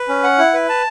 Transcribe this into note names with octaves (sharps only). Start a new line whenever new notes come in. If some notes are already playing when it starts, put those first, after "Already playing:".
Already playing: B4
C#4
F#5
E4
B4
A5